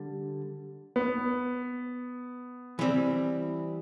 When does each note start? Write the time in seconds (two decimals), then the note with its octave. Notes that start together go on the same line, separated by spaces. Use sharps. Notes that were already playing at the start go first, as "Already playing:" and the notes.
Already playing: D3 G3
0.96 B3
2.79 E3 G3 C4